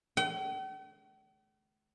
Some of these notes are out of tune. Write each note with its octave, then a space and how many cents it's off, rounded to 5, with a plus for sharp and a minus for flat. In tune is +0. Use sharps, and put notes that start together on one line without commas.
G5 -45